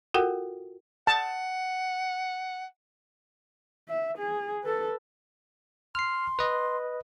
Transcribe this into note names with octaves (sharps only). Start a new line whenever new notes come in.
F4 F#4 A4 A#4 F#5 G5
F#5 A5
E5
G#4
A4 B4
C6 F6 C7
B4 D#5